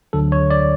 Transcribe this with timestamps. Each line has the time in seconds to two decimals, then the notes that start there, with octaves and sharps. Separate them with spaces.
0.13 D2 D3 F#3 A4
0.32 C#5
0.51 D5